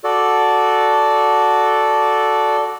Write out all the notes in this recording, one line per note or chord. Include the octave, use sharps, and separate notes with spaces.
F#4 A4 D5